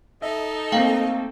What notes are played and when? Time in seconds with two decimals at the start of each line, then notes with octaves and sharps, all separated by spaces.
0.22 D#4 A4 D#5 E5
0.72 A3 A#3 C4 F5 G5